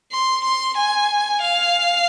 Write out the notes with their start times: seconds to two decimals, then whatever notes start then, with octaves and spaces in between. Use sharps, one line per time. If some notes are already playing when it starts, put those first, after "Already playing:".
0.12 C6
0.44 C6
0.77 G#5
1.42 F5